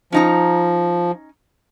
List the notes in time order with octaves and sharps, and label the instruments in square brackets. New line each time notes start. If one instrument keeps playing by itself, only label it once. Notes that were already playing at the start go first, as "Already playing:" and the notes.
[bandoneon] F3 [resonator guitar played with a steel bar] C#4 D#4 A#5